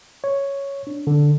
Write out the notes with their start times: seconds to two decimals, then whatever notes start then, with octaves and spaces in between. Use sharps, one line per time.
0.24 C#5
0.87 D4
1.07 D3